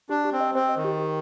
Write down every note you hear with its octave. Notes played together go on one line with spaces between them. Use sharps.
D4 G4
G4
C4
D#5
C4 C5
D#5
D#3
G4
G4